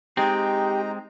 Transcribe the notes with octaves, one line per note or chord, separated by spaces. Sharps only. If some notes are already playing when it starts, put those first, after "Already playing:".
G#3 C4 D#4 G4 G5 A#5